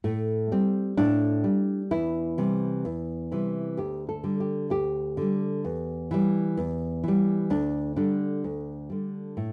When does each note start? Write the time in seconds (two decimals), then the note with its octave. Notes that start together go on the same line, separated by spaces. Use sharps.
0.04 A2 A3
0.52 G3 C4
0.97 A2 D4
1.44 G3
1.91 E2 E4
2.38 C3 E3 G3
2.85 E2
3.32 C3 E3 G3
3.77 D2 G4
4.09 A4
4.24 D3 G3
4.40 G4
4.70 D2 G4
5.17 D3 G3
5.65 E2
6.11 E3 G3
6.57 E2
7.04 E3 G3
7.50 D2 D4
7.96 D3 G3 D4
8.44 D2
8.90 D3 G3
9.37 A2